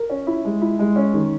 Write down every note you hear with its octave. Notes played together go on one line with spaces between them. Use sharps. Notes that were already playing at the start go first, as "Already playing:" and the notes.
Already playing: A#4
C#4
E4
G#3
E4
G#3
C#4
D#3